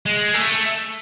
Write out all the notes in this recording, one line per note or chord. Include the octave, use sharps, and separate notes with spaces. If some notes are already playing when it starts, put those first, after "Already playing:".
G#3
A3